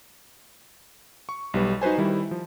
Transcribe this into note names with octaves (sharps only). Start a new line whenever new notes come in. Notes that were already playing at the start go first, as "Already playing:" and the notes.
C#6
B1 G3 B4
D#4 F#4 B4 C5 G#5
D#3 G3 E4
F3